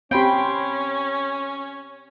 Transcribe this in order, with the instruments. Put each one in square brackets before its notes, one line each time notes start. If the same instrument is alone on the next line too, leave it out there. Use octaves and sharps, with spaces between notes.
[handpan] C4 G4 [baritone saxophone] C#4 [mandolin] G5 B5 C6